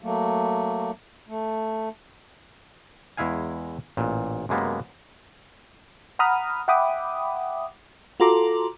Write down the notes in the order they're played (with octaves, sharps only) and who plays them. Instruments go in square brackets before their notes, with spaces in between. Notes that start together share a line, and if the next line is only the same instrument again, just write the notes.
[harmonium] F#3 A3 A#3
A3
[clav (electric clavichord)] E2 G#3 E4 F5 G#5
A1 A#2
F#2 C3 G#3 A#3 B3
[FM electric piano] F#5 A#5 B5 D#6 F6
E5 F#5 G5 B5 D6 D#6
F4 F#4 A4 A#5 C6 D6